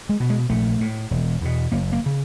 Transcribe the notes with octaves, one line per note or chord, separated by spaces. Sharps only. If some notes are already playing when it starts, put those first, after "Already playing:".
G#3
B2
G#3
A#1 A3
A2
E1
E2 B2
F#1 A#3
A#3
C#3